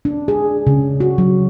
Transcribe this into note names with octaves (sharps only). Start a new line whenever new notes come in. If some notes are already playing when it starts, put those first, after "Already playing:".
D4
G#4
C#3
F#4
F#3